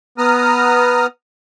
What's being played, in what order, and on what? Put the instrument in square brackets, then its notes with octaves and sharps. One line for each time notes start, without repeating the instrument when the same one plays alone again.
[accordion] B3 A#5 D#6 F6